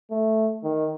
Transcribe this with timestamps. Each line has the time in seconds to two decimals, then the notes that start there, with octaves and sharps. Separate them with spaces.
0.11 A3
0.64 D#3